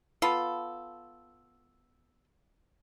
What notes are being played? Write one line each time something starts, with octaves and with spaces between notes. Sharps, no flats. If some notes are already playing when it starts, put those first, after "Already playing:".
B3 F4 A4